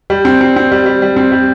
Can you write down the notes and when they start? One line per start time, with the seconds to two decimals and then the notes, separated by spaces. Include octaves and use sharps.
0.10 G3
0.25 C4
0.41 C4
0.56 C4
0.72 G3
0.86 G3
1.02 G3
1.16 C4
1.32 G3